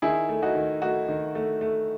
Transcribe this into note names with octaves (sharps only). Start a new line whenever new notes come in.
D#3 E4 G#4
A3
D#4 F#4
D#3
A3 D#4 F#4
D#3
A3
A3